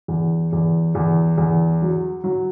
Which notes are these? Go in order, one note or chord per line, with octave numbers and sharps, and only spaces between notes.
E2
E2
E2
E2
F#3
F#3